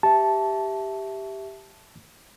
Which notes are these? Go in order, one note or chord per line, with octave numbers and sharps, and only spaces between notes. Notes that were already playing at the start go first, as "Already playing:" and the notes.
G4 E5 A5